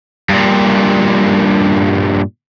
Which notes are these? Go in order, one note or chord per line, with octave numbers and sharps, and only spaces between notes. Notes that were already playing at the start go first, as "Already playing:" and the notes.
G2 A#2